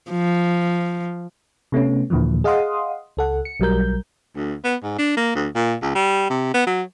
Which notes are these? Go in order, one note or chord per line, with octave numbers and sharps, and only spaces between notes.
F3
C3 A3 B3 C#4
D#2 A#2 D3 E3 F3
G#4 D#5 F5 F#5 C6 D#6
C#2 A4 F#5
C#7
B1 F#3 G3 A#4 G6
D2
B3
G#2
D4
A#3
D2
A#2
C#2
G3
C3
B3
F#3